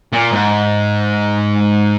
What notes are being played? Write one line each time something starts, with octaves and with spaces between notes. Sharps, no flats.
A#2
G#2